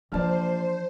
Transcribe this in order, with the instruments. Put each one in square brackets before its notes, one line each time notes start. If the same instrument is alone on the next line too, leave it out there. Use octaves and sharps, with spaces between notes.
[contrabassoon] A#1 [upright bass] E3 F3 [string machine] C5 [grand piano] D5 A5 F6